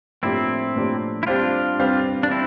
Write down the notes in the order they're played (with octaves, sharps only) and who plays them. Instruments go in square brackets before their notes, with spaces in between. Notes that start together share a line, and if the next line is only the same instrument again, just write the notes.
[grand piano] A2 F3 A#3 D4 G4 [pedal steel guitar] C4 E4
[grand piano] A2 F3 A#3 D4 G4
[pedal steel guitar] E4
[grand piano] G3 C4 G4 C5 F5 [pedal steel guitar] D4 F4
[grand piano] G3 C4 G4 C5 F5
[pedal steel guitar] D4
C4 E4